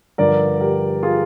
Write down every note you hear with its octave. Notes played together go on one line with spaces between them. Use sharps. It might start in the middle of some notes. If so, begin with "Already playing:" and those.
G2 D3 F3 A#4 D5
G4 A#4
F4 G#4